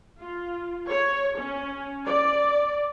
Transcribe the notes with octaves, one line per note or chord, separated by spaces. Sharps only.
F4
C#5
C#4
D5